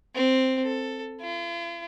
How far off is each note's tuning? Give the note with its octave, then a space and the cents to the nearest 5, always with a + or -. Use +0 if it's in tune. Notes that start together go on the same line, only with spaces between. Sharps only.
C4 +0
A4 +10
F4 -45